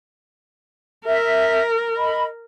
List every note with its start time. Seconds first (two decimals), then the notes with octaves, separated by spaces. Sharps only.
1.06 A#4 E5
1.96 D#5 B5